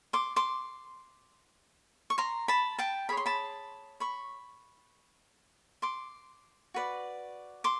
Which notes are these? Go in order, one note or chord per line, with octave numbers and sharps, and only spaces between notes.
C6 D6
C6 D6
C#6
A#5 C6
A5 B5
G5 A5
G#4 C#5 B5
C6
A5 B5
B5 C#6
C6 D6
F#4 B4 D5
C6 D6